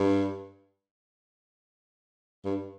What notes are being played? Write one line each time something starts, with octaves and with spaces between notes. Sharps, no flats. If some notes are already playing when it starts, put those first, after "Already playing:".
Already playing: G2
G2